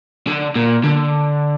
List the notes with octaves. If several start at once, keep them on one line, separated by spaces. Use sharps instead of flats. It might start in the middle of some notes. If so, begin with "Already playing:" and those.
D3
A#2
D3